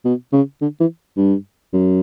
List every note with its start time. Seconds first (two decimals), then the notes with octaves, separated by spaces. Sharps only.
0.05 B2
0.33 C#3
0.61 D3
0.80 E3
1.17 G2
1.73 F#2